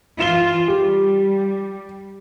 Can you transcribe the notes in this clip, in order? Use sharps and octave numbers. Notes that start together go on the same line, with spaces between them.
E3 F4 E7 G7
G3 G4